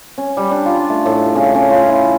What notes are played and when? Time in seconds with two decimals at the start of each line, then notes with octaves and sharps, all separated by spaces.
0.18 C#4
0.37 G3
0.51 D4
0.65 F4
0.90 A3
1.05 A2
1.35 C#3
1.55 C#4
1.70 F4
1.88 E4